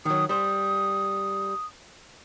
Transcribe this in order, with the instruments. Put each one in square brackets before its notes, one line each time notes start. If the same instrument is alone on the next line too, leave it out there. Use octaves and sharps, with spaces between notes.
[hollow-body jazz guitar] D#3 F#3 [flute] D#6
[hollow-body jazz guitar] G3 C5 [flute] D#6